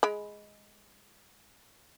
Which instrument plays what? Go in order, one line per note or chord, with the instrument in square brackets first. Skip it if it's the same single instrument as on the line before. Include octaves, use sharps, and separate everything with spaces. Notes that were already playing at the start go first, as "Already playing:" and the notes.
[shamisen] G#3 B5